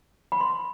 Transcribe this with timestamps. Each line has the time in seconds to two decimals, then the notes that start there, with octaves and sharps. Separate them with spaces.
0.32 B5
0.40 C6